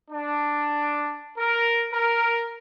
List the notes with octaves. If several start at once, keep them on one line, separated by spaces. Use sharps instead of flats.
D4
A#4
A#4